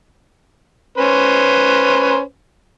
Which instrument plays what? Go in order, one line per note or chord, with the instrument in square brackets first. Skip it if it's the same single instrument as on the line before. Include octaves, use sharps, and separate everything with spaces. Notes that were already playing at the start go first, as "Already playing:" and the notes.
[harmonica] C#4 B4 C5